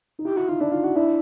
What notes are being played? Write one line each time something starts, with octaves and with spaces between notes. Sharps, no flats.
D#4
E4 G4
E4 F#4
D#4 F4
D4 E4
D#4 F4
E4 F#4
D4 E4